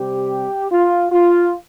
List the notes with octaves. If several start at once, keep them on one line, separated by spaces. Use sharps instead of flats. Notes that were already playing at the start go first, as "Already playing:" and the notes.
Already playing: C3 G3 C4 G4
F4
F4